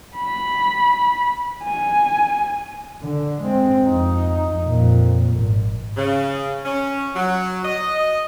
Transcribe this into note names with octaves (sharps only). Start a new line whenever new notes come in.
B5
G#5
D3
G#3 C4
F2 D#4
F2 A#2
G#1
C#3
C#4
F#3
D#5